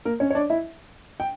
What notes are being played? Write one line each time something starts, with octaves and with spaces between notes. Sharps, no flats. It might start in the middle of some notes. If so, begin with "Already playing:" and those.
A#3 A#4
C#4 C#5
C#5
D4 D5
E4 E5
G5